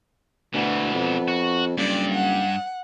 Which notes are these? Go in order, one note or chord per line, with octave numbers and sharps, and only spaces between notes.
D2 B2 E3 B3
F2
F#4
F#1 G2 D5
F#5